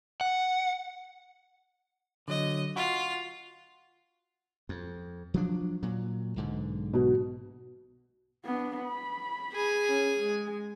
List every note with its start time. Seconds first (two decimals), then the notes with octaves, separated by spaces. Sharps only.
0.21 F#5
2.28 D3 F#3 D#5
2.76 F4 F#4
4.69 F2
5.34 F3 F#3 D4
5.83 A#2 F#3
6.36 B1 G#2 D3
6.94 B2 F#4
8.45 B3 D4
8.84 B5
9.52 G#4 G#5
9.88 C#4
10.18 G#3